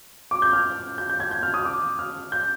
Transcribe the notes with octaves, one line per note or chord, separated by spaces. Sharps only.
D6
G6
F6
G6
G6
G#6
G6
F6
D#6
D6
F6
G6